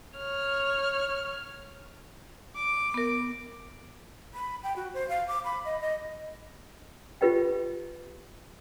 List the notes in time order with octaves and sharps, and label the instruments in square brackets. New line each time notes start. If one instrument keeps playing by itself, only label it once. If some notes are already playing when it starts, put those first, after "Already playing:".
[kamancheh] C#5 F6
[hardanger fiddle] D6
[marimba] B3 A#4
[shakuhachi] B5
G5
F#4
C5
F5
D6
B5
D#5
D#5
[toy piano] F4 G4 B4 D#5 G5